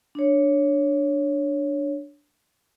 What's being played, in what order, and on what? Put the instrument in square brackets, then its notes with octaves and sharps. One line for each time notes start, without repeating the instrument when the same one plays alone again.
[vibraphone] D4 C#5